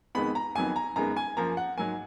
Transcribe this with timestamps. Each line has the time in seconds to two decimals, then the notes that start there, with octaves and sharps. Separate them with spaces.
0.15 F2 D#3 G#3 B3 B5
0.35 A#5
0.55 F2 D#3 F#3 B3 G#5
0.76 A#5
0.96 F#2 D#3 G#3 B3 A#5
1.17 G#5
1.37 F#2 F3 A#3 A#5
1.57 F#5
1.77 G#2 F#3 A#3 G#5